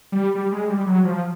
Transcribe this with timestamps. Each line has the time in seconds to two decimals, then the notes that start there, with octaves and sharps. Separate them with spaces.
0.12 G3
0.35 G3
0.52 G#3
0.70 G3
0.87 F#3
1.05 F3